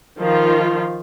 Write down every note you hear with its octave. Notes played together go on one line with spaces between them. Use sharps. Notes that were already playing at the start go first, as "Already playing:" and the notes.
D#3 F3 F4